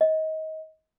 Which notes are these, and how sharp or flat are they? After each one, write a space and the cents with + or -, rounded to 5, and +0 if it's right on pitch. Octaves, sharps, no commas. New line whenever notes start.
D#5 +25